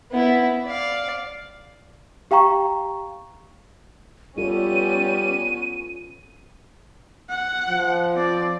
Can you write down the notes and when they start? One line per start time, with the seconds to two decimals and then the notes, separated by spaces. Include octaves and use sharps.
0.11 B3 E4
0.66 D5 F5
2.31 G4 F5 G5 A#5 C#6
4.38 G3 B3 C#4 F4 A4 D#7
7.29 F#5
7.69 F3
8.13 C4 D5